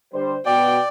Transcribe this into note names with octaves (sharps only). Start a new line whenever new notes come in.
D3 G3 C5
B2 D5 G5